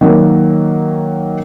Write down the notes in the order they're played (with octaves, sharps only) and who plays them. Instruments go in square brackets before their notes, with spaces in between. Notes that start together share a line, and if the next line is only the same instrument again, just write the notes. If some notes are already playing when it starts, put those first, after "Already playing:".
[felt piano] D#3 F#3 A#3